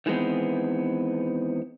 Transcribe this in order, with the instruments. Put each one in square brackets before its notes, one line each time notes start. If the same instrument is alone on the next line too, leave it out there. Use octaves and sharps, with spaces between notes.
[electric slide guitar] D#3 E3 G#3 B3 C4